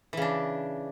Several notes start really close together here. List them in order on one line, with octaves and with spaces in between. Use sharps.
E3 C#3 D4